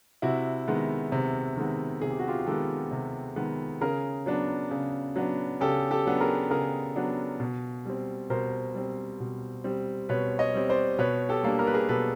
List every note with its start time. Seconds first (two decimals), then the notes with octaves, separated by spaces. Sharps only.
0.22 C3 E4 F#4
0.68 D#3 G#3 B3
1.12 C3
1.57 D#3 G#3 B3
2.02 C3 G#4
2.11 G4
2.19 F#4
2.27 F4 G4
2.46 D#3 G#3 B3 G4 A4
2.91 C3
3.36 D#3 G#3 B3
3.81 C#3 G#4 A#4
4.26 F#3 B3 D4
4.71 C#3
5.16 F#3 B3 D4
5.61 C#3 G4 A4
5.91 G4 A4
6.06 F#3 B3 D4
6.21 G#4 A#4
6.51 C#3 G#4 A#4
6.96 F#3 B3 D4
7.40 B2
7.85 G3 C4
8.30 B2 A#4 C5
8.74 G3 C4
9.20 B2
9.64 G3 C4
10.09 B2 B4 C#5
10.39 C#5 D#5
10.54 G3 C4
10.70 C5 D5
10.99 B2 B4 C#5
11.29 G4 A4
11.43 G3 A#3 D4
11.59 A#4
11.67 B4
11.74 G#4 A#4
11.89 B2 A4 B4